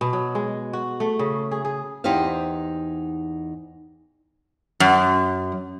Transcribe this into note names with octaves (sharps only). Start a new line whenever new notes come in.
B2
F#3
G#3
F#4
A3
C#3
G#4
G#4
E2 D#4 G4 C5 F5
F#2